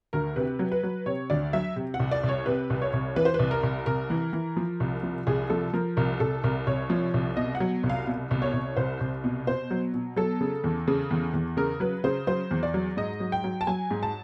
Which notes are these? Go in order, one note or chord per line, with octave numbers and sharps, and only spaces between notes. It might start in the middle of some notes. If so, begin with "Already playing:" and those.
D2 A#4
C3 B4
F#3
B4
F#3
C3 C#5
D2 D5
F#3 E5
C3
F#5
C2
D5
C2
C#5
C3 B4
C2
C#5
C2
E3 B4
C5
B4
C2
A#4
C2
C2 A#4
E3
E3
F3
C2
F3
C2 G#4
F3 A4
F3 A#4
C2 A#4
C2 A4
C2 A#4
C2 C#5
F3
C2
B2 D#5
F#5
F#3
C2
F5
B2
C2
C#5
C2
C2 C5
C2
B2
B2 C5
F#3
B2
F#3 A4
C#3
E2
C#3
E2
E2
C#3 A#4
F#3 B4
C#3 C5
F#3 C5
E2
D5
F#3
G#2 D#5
F#3
G5
F#3
A5
F#3 G#5
G#2
A5